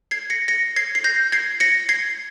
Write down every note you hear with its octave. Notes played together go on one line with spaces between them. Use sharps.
G#6 C7
A#6 C#7
A#6 C#7
G#6 C7
C7
G6 A#6
G#6 C7
A#6 C#7
G#6 C7